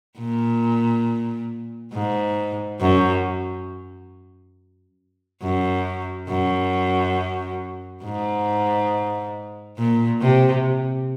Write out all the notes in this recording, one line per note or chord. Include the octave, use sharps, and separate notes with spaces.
A#2
G#2
F#2
F#2
F#2
G#2
A#2
C3